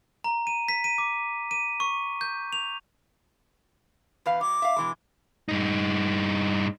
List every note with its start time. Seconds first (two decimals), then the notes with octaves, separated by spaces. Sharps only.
0.24 A#5
0.47 D#7
0.68 B6
0.84 D#7
0.98 D6
1.51 D#7
1.80 C#6
2.21 G6
2.53 F7
4.26 E2 B4 F5
4.41 F#3 D6
4.62 E5 F5
4.76 B2 E3 G#3
5.49 G2 D#4